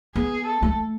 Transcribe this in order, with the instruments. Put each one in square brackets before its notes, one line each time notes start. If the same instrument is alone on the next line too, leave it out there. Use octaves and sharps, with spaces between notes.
[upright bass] B3 [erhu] G#4
[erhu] A4
[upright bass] A3